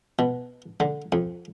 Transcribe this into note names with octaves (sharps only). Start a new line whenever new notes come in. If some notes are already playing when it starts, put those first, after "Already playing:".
B2
D3
F2